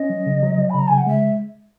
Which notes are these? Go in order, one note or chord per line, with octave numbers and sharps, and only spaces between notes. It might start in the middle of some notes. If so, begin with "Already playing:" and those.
Already playing: C#4 D#5
F#3
C#3
F#3
F#3
B5
C#3 A#5
C#3 G#5
F#5
G#3 E5